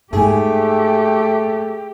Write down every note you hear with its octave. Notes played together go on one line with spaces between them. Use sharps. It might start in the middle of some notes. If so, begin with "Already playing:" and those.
G#2 A3 A#3 G4 G#4